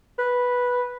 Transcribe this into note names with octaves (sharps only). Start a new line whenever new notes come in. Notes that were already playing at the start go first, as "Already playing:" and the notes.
B4